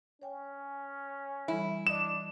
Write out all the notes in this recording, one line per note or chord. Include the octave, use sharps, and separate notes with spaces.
C#4 C#5 G5 G#5
E3 G3 E4 A4
D4 D5 D#5 D#6 E7